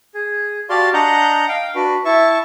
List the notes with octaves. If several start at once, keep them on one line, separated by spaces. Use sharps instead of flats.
G#4
F#4 G4 D5 F5 A5 C6
D4 D#5 F#5 A#5 G6
F5 G5
D4 F#4 B4
E4 E5 A5 C#6